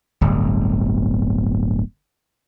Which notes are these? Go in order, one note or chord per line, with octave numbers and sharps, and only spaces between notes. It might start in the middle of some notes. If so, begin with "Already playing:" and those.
D1 G1